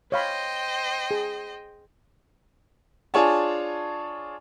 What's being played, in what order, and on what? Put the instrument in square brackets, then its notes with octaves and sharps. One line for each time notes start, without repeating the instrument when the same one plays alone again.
[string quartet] C5 D#5 G5 [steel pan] C#5 F5 B5
[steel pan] G#4
[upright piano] D4 F4 G#4 C#5 G#5 A5